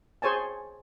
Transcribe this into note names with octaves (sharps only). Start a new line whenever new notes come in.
G#4 C5 C#5 G#5 A5